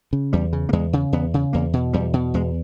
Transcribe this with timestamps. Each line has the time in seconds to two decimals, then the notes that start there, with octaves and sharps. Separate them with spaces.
0.13 C#3
0.33 E2 G3
0.53 C#3
0.69 A#3
0.73 E2 G#3
0.93 C#3
1.13 E2 B3
1.34 C#3
1.53 E2 A#3
1.73 B2
1.93 E2 G3
2.14 B2
2.34 E2 G#3